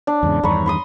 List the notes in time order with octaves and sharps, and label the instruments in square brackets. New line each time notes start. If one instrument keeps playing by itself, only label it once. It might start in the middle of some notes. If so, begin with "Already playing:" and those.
[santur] D4
[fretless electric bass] E2 G#2 C#3
[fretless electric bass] E2 G2 D#3 [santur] A#5 B5 C#6
[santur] B5 C6 D#6